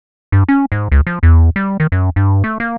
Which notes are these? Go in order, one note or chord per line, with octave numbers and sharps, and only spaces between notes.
G2
C#4
G#2
C#2
F3
E2
G3
D#3
F#2
G2
A3
A#3